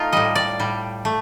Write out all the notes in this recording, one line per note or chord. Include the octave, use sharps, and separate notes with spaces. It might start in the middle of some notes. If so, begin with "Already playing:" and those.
Already playing: A3 D#4 F4
A2 G3 D#5
D5
A2 G3
A3